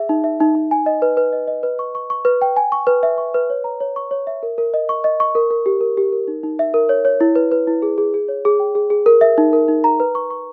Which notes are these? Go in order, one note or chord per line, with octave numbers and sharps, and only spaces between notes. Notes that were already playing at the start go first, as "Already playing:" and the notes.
Already playing: G#4 E5
D#4
E5
D#4
D#4
G#5
D#5
B4
B4
D#5
D#5
B4
C#6
C#6
C#6
B4
G5
G#5
C#6
B4
E5
C#6
B4
C#5
A#5
C#5
C#6
C#5
E5
A#4
A#4
D#5
C#6
D#5
C#6
A#4
A#4
G4
A#4
G4
A#4
D#4
D#4
E5
A#4
C#5
C#5
E4
B4
B4
E4
G#4
G#4
G#4
C#5
G#4
G5
G#4
G#4
A#4
E5
D#4
A#4
D#4
A#5
B4
C#6
C#6